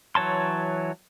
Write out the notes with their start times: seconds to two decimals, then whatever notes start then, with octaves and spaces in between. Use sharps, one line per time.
0.15 E3 F#3 C#5 A5 C6